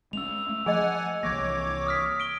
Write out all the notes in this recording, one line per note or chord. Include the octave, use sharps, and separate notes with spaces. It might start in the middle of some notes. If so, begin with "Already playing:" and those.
G#3 C4 C#4 E6 F7
A3
F3 G#4 D#5 F#5 G#5
C2 E3 A#3 C#5 D6 G#6 A#6
D#6 F6 B6
D7 G7